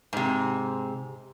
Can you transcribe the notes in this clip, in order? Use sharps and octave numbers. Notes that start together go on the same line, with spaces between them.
G#2 C3